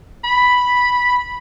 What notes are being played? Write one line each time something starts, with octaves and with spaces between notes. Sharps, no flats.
B5